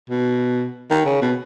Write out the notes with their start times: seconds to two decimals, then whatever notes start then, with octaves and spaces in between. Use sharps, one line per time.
0.10 B2
0.90 D#3
1.05 C#3
1.22 B2